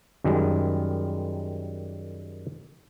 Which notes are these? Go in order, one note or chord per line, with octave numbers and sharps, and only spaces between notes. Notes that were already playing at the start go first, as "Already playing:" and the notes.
F#2 D#3 G3 G#3